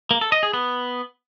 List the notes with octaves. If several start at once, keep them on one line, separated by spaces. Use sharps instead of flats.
A#3
A4
D#5
G#4
B3